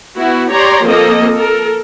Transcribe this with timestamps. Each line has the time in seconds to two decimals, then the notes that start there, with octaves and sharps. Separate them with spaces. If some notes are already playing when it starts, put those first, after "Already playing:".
0.15 B3 E4 F#4
0.50 G4 C#5 D5 A#5 C6
0.85 F3 A#3 C4 A4 D#5
1.34 A4 A#4